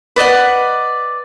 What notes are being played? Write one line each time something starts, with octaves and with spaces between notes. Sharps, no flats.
B4 D5 D#5 F#5